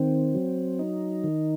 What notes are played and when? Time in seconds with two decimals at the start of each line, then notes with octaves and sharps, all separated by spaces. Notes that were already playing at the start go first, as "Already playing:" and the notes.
Already playing: D#3 C4
0.35 F#3
0.79 D#4
1.24 D#3